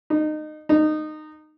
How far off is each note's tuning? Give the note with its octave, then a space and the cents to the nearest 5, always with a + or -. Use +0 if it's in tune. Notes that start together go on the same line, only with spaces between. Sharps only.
D#4 -25
D#4 -20